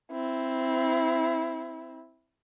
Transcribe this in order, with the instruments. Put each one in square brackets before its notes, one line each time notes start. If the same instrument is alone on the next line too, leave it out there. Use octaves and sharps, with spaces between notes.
[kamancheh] C4 E4